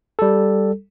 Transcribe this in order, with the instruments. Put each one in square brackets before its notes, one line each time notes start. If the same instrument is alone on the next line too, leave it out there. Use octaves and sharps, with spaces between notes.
[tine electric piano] G3 A4